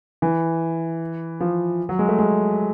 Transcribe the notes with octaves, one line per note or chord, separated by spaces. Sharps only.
E3
F3
F#3
G#3
A3
G#3